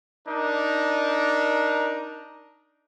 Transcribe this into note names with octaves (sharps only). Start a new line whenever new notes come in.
D4 D#4 A#4